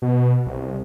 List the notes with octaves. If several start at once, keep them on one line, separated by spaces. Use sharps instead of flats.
B2
C2